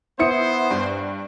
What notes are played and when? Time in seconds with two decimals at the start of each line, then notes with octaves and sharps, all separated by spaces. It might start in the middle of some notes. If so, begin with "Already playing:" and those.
0.19 B3 E4 C5 D#6 C#7
0.71 G2